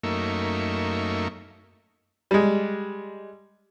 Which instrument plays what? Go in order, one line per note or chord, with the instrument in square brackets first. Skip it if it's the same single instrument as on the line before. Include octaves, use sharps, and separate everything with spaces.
[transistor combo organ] F#2 A3 A#3 D#4 E5 C#6
[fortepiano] G3 G#3